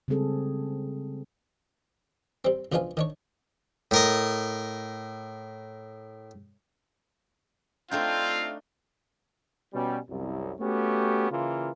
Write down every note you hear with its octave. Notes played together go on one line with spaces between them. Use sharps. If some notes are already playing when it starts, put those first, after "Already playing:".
C#3 G3 G#3 C4 G#4 A4
G3 C4
C#2 B2 F3 D4 F4 G#5
D#3 D4 C#5
A2 A#4 D#5
A3 C4 D4 D#4 F4 F5 G5
B2 G3 C#4
C2 F#2
A3 B3 C#4 F#4 G4
C#3 E3 A#3 F4